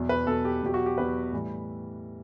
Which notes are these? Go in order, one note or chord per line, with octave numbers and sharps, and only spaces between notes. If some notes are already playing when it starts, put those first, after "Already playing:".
Already playing: E2 B2 F#3
B4
E2 B2 F#3 A4
G4
E2 B2 F#3 G4
F#4
G4
E2 B2 F#3 B4
A2 E3 G3